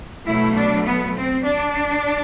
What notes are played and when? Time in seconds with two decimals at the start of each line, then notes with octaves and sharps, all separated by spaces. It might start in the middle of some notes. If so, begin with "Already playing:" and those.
0.25 B2 F#3 A3 E4
0.56 D4
0.86 B3
1.17 C4
1.46 D4